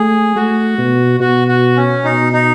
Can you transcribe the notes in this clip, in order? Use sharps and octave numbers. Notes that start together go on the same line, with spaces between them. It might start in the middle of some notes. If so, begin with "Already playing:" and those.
Already playing: A3 G#4
A3 F#4
B2
B2 F#4
F#4
C#4
B2 D#4
D#4